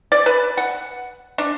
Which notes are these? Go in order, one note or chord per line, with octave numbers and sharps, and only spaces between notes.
D5
B4 B5
F#5
D4